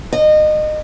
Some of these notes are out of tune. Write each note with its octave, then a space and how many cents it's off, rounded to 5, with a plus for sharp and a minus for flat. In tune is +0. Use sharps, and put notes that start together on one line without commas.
D#5 -25